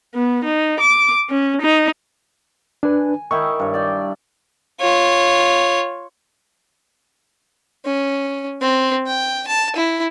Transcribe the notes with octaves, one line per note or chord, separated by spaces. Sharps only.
B3
D#4
D6
C#4
D#4
D4 B4 G#5
D#3 E4 G5 C#6
G2 C#5
D5 G5
F4 C#5
C#4
C4
G5
A5
E4